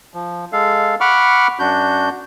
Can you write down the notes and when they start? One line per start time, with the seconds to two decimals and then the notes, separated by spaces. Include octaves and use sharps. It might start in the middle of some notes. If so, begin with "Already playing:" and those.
0.14 F3
0.53 G#3 A4 F5
1.01 F#5 B5 C#6 D6 F6
1.59 F#2 D4 F#4 G6